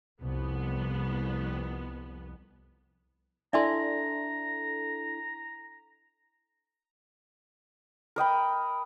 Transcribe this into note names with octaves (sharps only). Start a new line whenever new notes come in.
C2 F2 B3
D4 E4 A4 D5 E5 G#5 A#5 C6
A#4 D#5 G5 B5